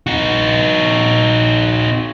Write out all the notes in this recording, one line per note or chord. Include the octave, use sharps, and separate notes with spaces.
D#4 F#4